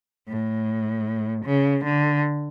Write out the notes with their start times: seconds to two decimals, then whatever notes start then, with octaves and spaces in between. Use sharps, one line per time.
0.28 A2
1.45 C#3
1.84 D3